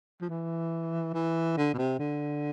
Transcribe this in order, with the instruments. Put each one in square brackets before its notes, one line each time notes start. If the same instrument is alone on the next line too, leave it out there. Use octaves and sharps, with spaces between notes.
[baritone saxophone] F3
E3
E3
D3
B2
C3
D3